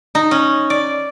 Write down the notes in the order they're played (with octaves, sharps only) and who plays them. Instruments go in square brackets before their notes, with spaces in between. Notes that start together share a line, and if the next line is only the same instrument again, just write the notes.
[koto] D#4
C#4
D5